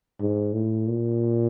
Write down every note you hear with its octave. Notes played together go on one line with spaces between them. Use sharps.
G#2
A2
A#2